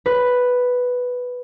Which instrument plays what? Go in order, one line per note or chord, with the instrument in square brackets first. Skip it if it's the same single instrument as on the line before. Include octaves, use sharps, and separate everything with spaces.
[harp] B4